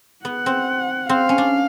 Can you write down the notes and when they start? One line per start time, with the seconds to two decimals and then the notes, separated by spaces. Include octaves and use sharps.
0.25 B3 F#5
0.46 C4
1.09 C4 F5
1.29 C#4
1.38 D4